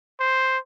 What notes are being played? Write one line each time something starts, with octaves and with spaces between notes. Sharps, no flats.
C5